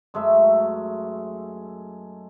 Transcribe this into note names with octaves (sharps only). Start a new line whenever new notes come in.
F#2 G#3 A3 E5